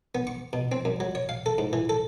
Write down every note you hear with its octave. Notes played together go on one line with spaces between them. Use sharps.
B3
C#6
B2
C4
F#2
F#3
C#5
F5
A4
G#2
E3
A4